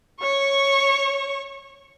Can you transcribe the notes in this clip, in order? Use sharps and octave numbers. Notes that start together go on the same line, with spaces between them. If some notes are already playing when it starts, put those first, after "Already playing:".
C#5 C#6